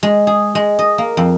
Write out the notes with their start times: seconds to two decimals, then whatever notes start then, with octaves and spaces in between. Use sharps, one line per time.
0.03 G#3
0.27 G#4
0.55 G#3
0.79 D#5
0.98 A#3
1.17 F2